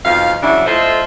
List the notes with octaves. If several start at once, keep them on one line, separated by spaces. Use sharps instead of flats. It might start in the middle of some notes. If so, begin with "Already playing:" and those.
F2 B2 D#4 F5
C#3 E3 F#3 D4 E4
A2 F4 A4 C5 D#5 E5